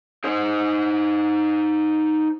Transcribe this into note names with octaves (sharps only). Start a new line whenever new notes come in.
D#4 C5